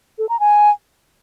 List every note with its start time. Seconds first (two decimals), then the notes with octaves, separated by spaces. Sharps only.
0.19 A4
0.29 A#5
0.40 G#5